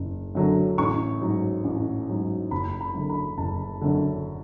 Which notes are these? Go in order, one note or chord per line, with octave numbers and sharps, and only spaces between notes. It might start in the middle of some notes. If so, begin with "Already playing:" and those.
Already playing: F#1
F#2 D3 F#3
A1 C#6
G#2 F#3
A1
G#2 F#3
F#1 B5
B5
F#2 D3
B5
F#1 A5
F#2 D3